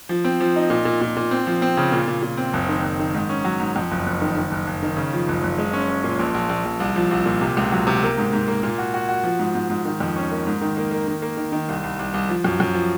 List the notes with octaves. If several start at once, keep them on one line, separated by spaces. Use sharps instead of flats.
F3
C4
F3
D#4
A#2
A#2
A#2
A#2
C4
F3
C4
C#3
A#2
A#2
A#2
C4
F#1
D#3
F#1
D#3
G#2
C#4
F#3
G#2
F2
F#1
F#1
D#3
D#3
F#1
F#1
D#3
C#3
F3
F#1
F#1
G#3
C#4
C#4
A#2
A#1
A#1
A#1
A#1
C2
F3
C2
A#2
C3
C#2
F#3
C3
A#3
G#2
G#2
A#3
A#2
F#4
F#4
F#4
F3
G#2
G#2
G#2
D#3
F2
C#4
A#3
G#2
D#3
A#3
A#3
D#3
A#3
D#3
D#3
C2
C2
C2
C2
F3
F#2
F#2
F3